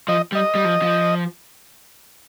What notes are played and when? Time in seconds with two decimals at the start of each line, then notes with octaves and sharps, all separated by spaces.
0.08 F3 D#5
0.32 G3
0.35 D#5
0.55 G3
0.65 F3
0.82 F3